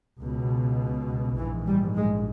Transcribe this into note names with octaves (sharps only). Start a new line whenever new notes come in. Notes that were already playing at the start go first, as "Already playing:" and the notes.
C#2 B2
A#1 G#2 E3
G3
G#3